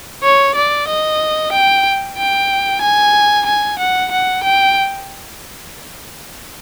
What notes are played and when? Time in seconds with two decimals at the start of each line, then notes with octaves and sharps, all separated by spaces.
0.23 C#5
0.55 D5
0.88 D#5
1.52 G5
2.17 G5
2.82 G#5
3.46 G#5
3.79 F#5
4.11 F#5
4.43 G5